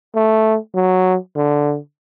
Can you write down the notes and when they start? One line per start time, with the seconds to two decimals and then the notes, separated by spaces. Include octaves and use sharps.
0.15 A3
0.75 F#3
1.36 D3